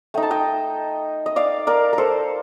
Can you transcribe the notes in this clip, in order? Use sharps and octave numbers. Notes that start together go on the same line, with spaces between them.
A3 D#4 G5
A5
D#5 G5
D#5
D5 F5
A#4 D5
A#4
A4 C5